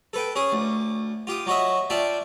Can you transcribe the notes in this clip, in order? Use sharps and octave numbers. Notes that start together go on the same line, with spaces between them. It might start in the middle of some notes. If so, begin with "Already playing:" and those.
A4 B4 G5
C#4 G#4
D2
F4 G4 D#6
F#3 F#4 D#5 E5
D4 F4 D5 E5 G5